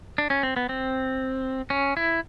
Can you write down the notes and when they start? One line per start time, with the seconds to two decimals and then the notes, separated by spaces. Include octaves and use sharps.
0.18 D4
0.30 C#4
0.43 C4
0.56 B3
0.69 C4
1.70 C#4
1.97 E4